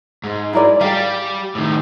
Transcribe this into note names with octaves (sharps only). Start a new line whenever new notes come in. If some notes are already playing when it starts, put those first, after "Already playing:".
G#2
E4 A#4 D5
G3 G4 G#4 F5
A2 D#3